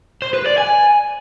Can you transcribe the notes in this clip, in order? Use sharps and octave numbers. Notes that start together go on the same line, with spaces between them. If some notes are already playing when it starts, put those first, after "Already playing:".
C5
B4
D5
G#5